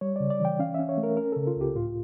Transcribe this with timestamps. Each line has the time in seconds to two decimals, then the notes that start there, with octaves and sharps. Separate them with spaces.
0.01 G3 C#5
0.16 C#3 D5
0.30 D5
0.40 E3 G5
0.59 C#4 F5
0.74 C#4 E5
0.89 C#5
0.98 A3
1.03 A#4
1.17 C#4 A#4
1.32 C#3 A4
1.47 F4
1.56 C#2 G4
1.75 A2 F4